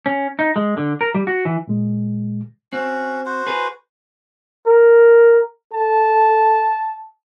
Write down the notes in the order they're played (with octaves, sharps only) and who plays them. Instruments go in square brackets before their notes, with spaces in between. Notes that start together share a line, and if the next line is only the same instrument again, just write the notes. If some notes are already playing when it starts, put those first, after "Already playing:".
[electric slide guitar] C#4
D#4
G#3
D3
A#4
G3
F#4
E3
[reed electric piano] A#2 G#3
[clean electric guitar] C4 [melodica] C#4 F#4
[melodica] F#4 C5
[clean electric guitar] G#4 B4
[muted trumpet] A#4
[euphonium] A4 [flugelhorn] A5